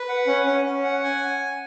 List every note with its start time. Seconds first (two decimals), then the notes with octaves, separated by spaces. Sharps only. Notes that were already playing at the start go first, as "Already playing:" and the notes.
Already playing: B4
0.09 F#5
0.27 C#4
0.46 C#4
0.65 C#4
0.84 F#5
1.03 G#5